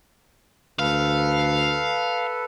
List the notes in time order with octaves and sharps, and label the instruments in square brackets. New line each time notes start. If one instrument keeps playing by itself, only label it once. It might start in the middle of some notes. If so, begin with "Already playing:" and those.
[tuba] D2 [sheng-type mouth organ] A4 B4 [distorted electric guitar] F5